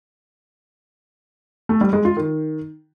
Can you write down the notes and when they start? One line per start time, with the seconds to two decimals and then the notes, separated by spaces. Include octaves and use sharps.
1.69 A3
1.81 G3
1.93 G#3
2.05 F4
2.17 D#3